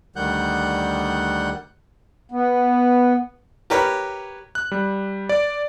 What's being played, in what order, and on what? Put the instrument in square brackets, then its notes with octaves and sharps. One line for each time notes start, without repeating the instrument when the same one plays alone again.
[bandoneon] D2 D#3 G3 F#5 F#6 G6
[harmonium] B3
[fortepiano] G4 A#4 B4 C#5
[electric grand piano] F#6
G3
D5